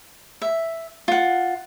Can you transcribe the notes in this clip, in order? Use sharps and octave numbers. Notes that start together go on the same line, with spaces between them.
E5
F4 F#5